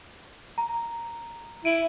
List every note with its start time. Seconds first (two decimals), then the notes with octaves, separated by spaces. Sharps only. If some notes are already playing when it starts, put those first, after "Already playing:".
0.58 A#5
1.65 E4 D7 D#7